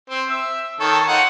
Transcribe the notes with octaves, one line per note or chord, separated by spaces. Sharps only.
C4 C5
E5
D#3 A4 C#5
D#4 F4 F#5